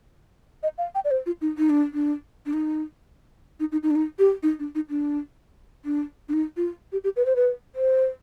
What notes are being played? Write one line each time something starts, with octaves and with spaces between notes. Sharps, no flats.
D#5
F5
G5
D5
C5
F4
D#4
D#4
D4
D4
D4
D#4
D#4
D#4
D#4
D4
D#4
G4
D#4
D4
D#4
D4
D4
D4
D#4
F4
G4
G4
B4
C5
B4
C5